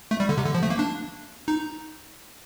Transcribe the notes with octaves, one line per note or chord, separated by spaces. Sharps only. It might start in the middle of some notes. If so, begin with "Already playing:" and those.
A3
G3
D3
C3
D3
F3
A3
A#3
D4
D#4